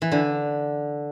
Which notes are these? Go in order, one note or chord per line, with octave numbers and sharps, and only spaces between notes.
E3
D3